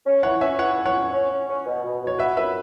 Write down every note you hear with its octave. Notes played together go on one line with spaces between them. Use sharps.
C#4
E3 C#5 F#5
C#4 E5 G#5
E3 C#5 F#5
E2
C#5 F#5
C#4
C#4
C#4
C#4
B2
B2
B2
C#5
F#4 B4 E5
F#2 B4 E5